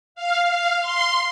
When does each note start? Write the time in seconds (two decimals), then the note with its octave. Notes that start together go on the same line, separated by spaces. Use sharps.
0.15 F5
0.49 F5
0.81 C6